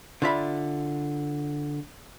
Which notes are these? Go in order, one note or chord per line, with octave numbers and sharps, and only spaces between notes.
D3 F4 E5 B5